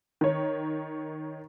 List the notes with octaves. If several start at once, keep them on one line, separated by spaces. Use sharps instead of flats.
D#3 C#5